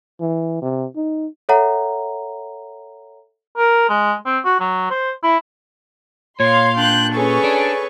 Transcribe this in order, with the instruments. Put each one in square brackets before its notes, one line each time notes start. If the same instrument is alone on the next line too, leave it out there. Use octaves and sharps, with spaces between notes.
[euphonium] E3
C3
D#4
[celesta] A4 C#5 E5 F#5 A#5
[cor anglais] A#4
G#3
C4
F#4
F#3
C5
E4
[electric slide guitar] A#2 [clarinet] C#5 [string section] F5 C6
[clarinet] D4 [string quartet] G5 F#6 G6
[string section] C#4 C#6 [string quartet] G#4 A4 B4
[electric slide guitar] D4 [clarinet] D5